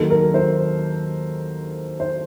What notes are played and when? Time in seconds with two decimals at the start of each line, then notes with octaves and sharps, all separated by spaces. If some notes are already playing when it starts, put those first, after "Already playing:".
Already playing: D#2 D#3 F#3 A#3 A4
0.10 A#4
0.34 C5
2.00 C5